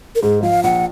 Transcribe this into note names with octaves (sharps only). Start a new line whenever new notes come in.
A#4
G#2 G#4
F3 F5
A#1 F#5